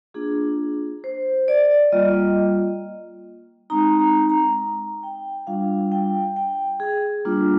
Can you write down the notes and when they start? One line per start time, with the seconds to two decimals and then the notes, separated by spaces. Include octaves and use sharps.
0.14 A#3 D4 F4 G#4
1.04 C5
1.48 D5
1.92 G3 A#3 F4 D#5
3.70 G#3 C4 D#4 A#5
3.99 A#5
4.29 A#5
5.03 G5
5.47 G3 D4 F4 F5
5.92 G5
6.36 G5
6.80 G#4
7.25 G3 A#3 D4 F4